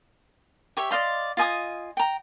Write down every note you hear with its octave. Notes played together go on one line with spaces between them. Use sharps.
G4 C#5 E5
D5 D#5 F5 C6
F4 D#5 G#5 D#6
G5 A#5